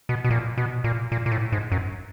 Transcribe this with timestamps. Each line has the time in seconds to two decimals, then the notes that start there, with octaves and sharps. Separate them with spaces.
0.09 B2
0.24 B2
0.30 A#2
0.58 B2
0.84 A#2
1.12 A#2
1.26 A#2
1.32 A2
1.52 G#2
1.72 F#2